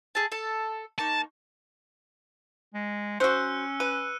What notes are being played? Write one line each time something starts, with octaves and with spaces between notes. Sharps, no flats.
G#4 A4 A5
A4 A5
A#3 D#4 A5 C#6
G#3
C#4 F#4 C5 E6 F#6 C#7
B4 D#7